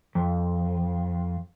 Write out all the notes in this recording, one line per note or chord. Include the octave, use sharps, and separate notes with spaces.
F2